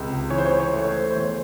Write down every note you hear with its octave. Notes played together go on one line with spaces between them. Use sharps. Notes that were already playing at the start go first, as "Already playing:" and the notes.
Already playing: C#2 C3
E3 C#5
C5
C#5
C#5
A3 C#5
C5
C5
E2 C#5